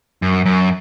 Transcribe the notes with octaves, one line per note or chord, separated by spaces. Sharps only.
F#2
F#2